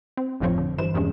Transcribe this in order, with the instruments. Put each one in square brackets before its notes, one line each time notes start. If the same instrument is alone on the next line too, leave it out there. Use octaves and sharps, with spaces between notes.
[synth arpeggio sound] C4
G1 F2 A2 F3 C4 C#5
D3
G2 E3 C5 E7
E2 G2 C3 E3 G#3 C#4